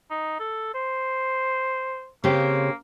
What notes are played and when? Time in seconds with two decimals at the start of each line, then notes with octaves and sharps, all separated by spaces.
0.11 D#4
0.40 A4
0.74 C5
2.24 C#3 A#3 C4 G4